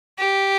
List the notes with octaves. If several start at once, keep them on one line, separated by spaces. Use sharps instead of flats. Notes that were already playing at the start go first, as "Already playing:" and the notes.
G4